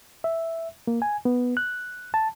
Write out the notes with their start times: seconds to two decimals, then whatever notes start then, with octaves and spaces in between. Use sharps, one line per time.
0.24 E5
0.87 A#3
1.02 G#5
1.25 B3
1.57 F#6
2.14 A5